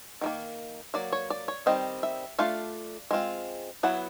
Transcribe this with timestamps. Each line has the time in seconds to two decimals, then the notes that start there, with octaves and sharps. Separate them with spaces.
0.21 D#3 G3 A#3
0.94 F#3 A#3 D5
1.13 C#5
1.30 D5
1.48 C#5
1.66 D#3 G3 C4 D#5
2.03 E5
2.39 A3 D4 F4 F5
3.11 G#3 C4 F4
3.83 F#3 B3 E4 F#5